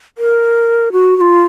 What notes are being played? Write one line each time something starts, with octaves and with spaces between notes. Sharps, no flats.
A#4
F#4
F#4
F4